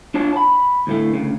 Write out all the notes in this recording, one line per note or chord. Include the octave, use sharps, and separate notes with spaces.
D4 F4 C#5 A5
A5 B5
D2 A2 A3
D2 C#3